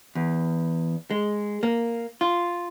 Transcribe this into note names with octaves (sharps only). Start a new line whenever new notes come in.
E2
G#3
A#3
F4